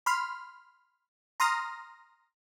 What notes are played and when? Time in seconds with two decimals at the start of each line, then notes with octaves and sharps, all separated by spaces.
0.06 B5 C6 F6
1.40 A#5 C6 D#6 F6 A#6